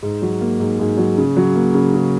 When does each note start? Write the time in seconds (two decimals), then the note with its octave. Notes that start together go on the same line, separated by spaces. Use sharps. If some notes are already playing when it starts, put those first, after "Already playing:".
0.03 G#2
0.22 F#3
0.41 A#3
0.60 G#2
0.80 G#2
0.98 F#3
1.18 C#3
1.37 F#3
1.56 A#3
1.74 C#3
1.94 C#3